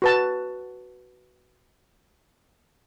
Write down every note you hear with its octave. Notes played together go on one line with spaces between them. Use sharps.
F#4 B4 A5